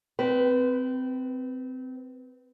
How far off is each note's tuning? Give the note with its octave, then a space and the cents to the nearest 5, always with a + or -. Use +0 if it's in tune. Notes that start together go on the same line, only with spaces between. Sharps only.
C4 -25 B4 +0